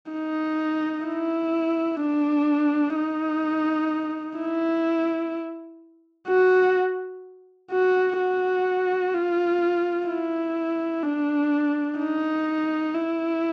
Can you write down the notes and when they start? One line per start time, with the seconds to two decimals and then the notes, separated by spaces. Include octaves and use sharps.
0.11 D#4
1.06 E4
2.01 D4
2.97 D#4
4.39 E4
6.28 F#4
7.71 F#4
8.19 F#4
9.14 F4
10.08 E4
11.04 D4
11.98 D#4
12.94 E4